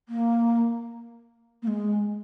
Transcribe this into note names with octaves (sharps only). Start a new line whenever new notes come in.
A#3
A#3
G#3